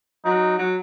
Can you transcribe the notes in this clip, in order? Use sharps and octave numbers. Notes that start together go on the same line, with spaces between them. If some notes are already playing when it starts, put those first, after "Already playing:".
F#3 D#4
F#3